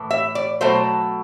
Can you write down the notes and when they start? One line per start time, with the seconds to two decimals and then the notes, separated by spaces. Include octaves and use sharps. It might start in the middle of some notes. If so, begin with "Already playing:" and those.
Already playing: A2 E3
0.10 E5
0.35 D5
0.61 B2 F#3 A3 C5